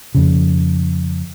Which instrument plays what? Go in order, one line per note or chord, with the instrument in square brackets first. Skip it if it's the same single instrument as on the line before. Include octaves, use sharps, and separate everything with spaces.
[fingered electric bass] F2 C#3